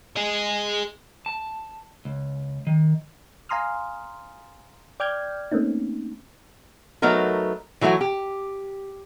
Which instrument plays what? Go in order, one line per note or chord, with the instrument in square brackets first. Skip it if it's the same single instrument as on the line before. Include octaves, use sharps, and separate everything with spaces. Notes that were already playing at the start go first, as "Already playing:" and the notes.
[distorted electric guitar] G#4 D#5
[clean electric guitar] A5
C#2
D#3
[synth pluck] F5 G#5 A#5 C6 D#6 F6
D5 G5 D6 F6 G6 G#6
A3 A#3 C4 C#4 D#4
[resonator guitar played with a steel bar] F#3 A3 B3 D#4 A#4
E3 F#3 A3 E4 F#4
G4